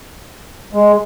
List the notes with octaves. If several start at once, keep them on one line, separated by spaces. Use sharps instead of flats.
G#3